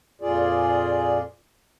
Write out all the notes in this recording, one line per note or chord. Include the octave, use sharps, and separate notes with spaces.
F2 A#2 F4 G#4 D5